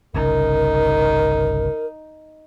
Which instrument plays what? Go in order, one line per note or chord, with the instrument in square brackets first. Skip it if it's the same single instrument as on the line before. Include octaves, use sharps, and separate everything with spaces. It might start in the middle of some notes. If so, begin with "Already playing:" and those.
[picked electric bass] G1 C2 C#3 [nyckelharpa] D#4 [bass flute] A#4